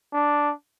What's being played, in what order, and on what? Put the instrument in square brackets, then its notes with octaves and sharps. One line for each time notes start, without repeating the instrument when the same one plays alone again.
[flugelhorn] D4